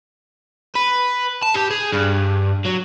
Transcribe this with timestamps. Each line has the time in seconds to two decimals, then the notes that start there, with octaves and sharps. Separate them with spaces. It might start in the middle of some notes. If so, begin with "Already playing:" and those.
0.75 B4
1.42 A5
1.54 G4
1.71 G#4
1.93 G2
2.66 F#3